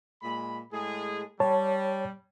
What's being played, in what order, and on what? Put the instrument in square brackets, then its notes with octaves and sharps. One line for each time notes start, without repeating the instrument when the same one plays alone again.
[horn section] A#2 G#3 B5
A2 G#3 G#4
[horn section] G3 [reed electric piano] C#5 A5